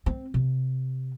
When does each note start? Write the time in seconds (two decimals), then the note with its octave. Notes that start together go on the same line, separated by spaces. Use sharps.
0.06 C4
0.34 C3